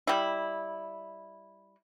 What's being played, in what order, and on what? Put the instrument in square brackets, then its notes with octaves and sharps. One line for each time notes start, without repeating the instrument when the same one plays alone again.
[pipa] G3 E4